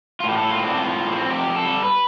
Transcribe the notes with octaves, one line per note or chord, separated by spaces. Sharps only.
F4
A2
G4
A2 A4
F4
C4 D4
A2 F4
A2
C4
F2 G4
F2
A4
G3
B4